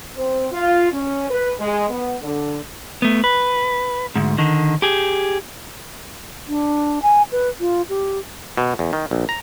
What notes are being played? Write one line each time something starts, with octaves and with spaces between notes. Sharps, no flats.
C4
F4
C#4
B4
G#3
B3
D3
A3 B3
B4
D2 G#2
D3 D#3
G4 G#4
D4
G#5
B4
F4
G4
B2
E2
D#3
A#1
A#5